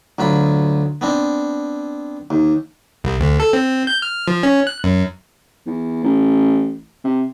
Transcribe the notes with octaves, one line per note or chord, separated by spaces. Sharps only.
D2 F#3 F4 B5
B3 C4 D4
D#2
C2
D2
A4
C4
G6
F6
F3
C#4
F#6
F#2
E2
A1
C3